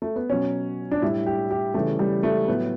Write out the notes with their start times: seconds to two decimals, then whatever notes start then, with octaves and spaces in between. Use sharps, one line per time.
0.02 A3
0.16 B3
0.30 B2 F#3 C#4
0.91 D4
1.02 A2 G3 E4
1.26 G4
1.50 G4
1.74 C#3 E3 G3 A3
1.99 G3
2.23 A3
2.48 A2 F#3 B3